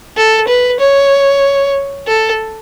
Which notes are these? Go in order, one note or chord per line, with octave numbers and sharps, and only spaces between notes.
A4
B4
C#5
A4